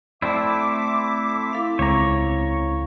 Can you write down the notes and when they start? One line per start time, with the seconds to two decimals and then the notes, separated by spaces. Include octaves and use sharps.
0.22 A3 C4 E4 D5 E5 D6
1.53 E4 A4 F5
1.79 C#2 C4 C#5 A#5